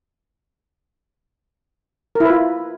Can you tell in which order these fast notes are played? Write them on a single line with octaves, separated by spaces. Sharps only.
A#4 E4 B4 F4